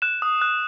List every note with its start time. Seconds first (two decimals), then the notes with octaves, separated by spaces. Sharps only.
0.02 F#6 E7
0.22 D#6
0.42 F#6